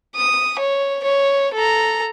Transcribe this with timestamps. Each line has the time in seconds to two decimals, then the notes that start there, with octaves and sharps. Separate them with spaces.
0.16 D#6
0.59 C#5
1.03 C#5
1.54 A4 A#5